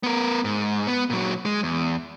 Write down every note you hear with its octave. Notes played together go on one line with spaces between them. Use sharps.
B3 A#4
G#2
B3
A#2 F#3
G#3
E2